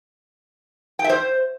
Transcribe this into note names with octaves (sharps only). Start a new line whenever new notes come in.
G5
E5
C5